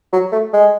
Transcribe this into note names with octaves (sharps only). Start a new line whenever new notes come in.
F#3
A3
G#3